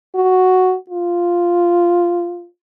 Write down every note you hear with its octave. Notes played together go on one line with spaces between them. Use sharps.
F#4
F4